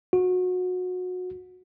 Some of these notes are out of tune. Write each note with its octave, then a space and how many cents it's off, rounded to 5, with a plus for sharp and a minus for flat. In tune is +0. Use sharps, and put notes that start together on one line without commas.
F#4 -25